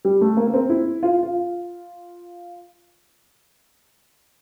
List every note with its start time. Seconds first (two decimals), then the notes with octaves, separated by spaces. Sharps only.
0.05 G3
0.21 A3
0.37 A#3
0.47 A#3
0.54 C4
0.70 E4
1.03 F4
1.23 F4